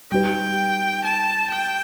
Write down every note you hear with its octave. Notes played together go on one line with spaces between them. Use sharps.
G3 D#4 G4 B4 G5
A5
G5